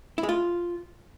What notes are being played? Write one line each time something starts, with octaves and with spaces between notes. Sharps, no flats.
E4
G#3
F4